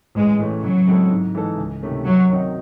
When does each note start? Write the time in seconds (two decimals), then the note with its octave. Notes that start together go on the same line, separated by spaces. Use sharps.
0.15 A1 G#3
0.39 A2 E3 A3 C#4
0.63 C#3 F#3
0.87 G#3 C4 E4 A4
1.10 G#2
1.35 E3 G#3 D#4 A4
1.58 C#2
1.82 C3 D#3 A3 C#4
2.06 F#2 F#3
2.29 D#3 F#3 C4 D#4